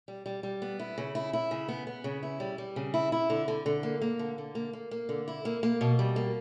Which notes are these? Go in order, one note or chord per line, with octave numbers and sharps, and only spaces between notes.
G3
G3
G3
B3
E4
C#3
E4
E4
C#3
B3
B3
C#3
E4
G3
G3
C#3
E4
E4
D3
D3
D3
A#3
A#3
D3
D3
A#3
A#3
A#3
D3
E4
A#3
A#3
B2
G3
A#3